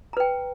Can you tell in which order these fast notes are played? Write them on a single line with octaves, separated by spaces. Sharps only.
A#5 B4 G5